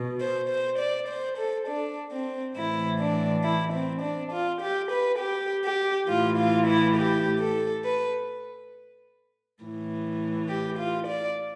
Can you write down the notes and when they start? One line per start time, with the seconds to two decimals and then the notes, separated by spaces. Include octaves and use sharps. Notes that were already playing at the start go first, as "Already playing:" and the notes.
Already playing: B2
0.21 C5
0.49 C5
0.79 D5
1.09 C5
1.38 A4
1.68 D4
2.12 C4
2.56 A2 E3 E4
3.00 D4
3.44 E4
3.73 C4
4.02 D4
4.32 F4
4.62 G4
4.91 B4
5.20 G4
5.64 G4
6.08 A2 E3 F4
6.38 F4
6.67 E4
6.97 G4
7.40 A4
7.85 B4
9.61 A2 E3
10.49 G4
10.79 F4
11.08 D5